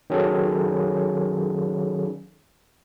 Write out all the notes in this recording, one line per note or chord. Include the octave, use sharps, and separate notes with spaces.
D#3 F#3 C#4 G#4 A4